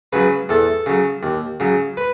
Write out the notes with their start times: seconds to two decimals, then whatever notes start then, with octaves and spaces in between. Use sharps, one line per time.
0.13 C#3 F#3 B4
0.49 E2 A4
0.86 C#3 F#3
1.23 D#2
1.60 C#3 F#3
1.97 B4